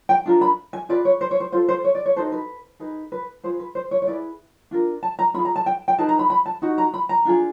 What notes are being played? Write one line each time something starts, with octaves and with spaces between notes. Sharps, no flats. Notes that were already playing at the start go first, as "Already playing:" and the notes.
G5
D4 F4 A#4
B5
G#5
F4 G#4 B4 D5
C#5
C5
C#5
C5
F4 A4 C5
C5
C#5
D5
C#5
D#4 F#4 A4 C5
B4
D#4 G#4 B4
B4
F4 G#4 B4 C5
B4
C5
C#5
C#5
E4 G#4 B4 D5
D4 F4 A#4
A5
A#5
C#4 F4 G#4 B5
A#5
A5
G5
G5
D#4 G#4 B4 A5
A#5
B5
B5
A5
D#4 F#4
A#5
B5
A#5
D4 F4 G#4